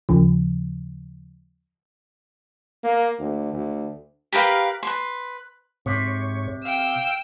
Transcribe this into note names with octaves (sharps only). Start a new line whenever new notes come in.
D#2 C#3 F3
A#3
D2
D2
G4 A#4 B4 F5
B4 C6
G#2 C3 C#5
F5 G5 E6